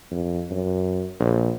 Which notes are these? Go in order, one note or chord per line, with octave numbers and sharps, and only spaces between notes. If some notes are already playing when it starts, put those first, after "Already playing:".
F2
F#2
A#1